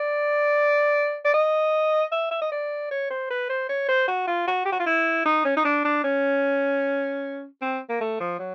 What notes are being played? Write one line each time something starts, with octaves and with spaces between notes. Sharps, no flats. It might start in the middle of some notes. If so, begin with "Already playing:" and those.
Already playing: D5
D5
D#5
E5
E5
D#5
D5
C#5
C5
B4
C5
C#5
C5
F#4
F4
F#4
G4
F#4
F4
E4
D#4
C#4
D#4
D4
D4
C#4
C4
A#3
A3
F3
F#3